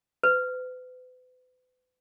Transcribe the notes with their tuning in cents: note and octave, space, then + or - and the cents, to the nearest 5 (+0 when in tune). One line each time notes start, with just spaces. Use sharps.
B4 +40